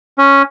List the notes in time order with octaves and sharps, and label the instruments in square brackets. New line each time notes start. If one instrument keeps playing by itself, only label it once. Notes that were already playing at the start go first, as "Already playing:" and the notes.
[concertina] C#4